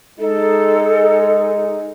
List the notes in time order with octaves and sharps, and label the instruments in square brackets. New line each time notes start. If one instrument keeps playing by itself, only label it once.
[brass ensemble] G#3 D#4 [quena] A4